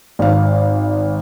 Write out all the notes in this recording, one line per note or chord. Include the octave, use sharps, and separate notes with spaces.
G#1 F5